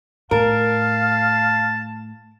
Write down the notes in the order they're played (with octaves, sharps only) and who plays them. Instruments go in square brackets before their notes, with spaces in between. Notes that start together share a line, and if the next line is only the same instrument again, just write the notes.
[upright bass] A2 [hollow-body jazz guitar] A#4 [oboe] F5 [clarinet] A5